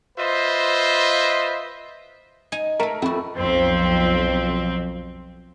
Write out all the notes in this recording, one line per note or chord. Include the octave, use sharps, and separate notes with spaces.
F4 B4 C5 D#5 E5
D#4 G#5
A3 A4 A#4
F2 E4 F#4
B1 F2 C4